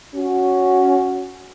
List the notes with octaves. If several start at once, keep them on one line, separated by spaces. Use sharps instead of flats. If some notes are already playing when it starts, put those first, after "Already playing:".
C#4 F#4